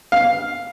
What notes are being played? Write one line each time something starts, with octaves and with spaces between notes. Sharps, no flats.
F5